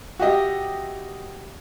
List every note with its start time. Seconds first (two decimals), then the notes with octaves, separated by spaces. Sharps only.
0.19 F#4 G4 D#5 E5